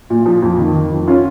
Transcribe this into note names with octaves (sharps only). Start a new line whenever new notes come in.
A#2
F3
F2
D#3
D#3
F2
C#4 F4